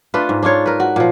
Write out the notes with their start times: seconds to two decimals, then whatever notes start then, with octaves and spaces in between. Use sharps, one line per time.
0.14 A3 D4 F4 B4
0.29 G#2
0.43 D4 D#4 F4 C#5
0.66 A#4 B4
0.80 F#4
0.96 A#2 F3